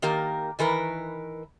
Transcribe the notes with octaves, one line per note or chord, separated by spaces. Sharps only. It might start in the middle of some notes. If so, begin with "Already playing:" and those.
D#3 A#3 G4 A#4
D#3 E3 A#4 B4